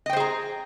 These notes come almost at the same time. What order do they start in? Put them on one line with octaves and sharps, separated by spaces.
D#5 G5 C5 G#4 A#5